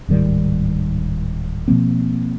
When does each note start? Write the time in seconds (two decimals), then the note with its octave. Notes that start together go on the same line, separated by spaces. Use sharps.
0.08 D1 G#2 D#3 G3
1.68 B2 F3 A#3 C4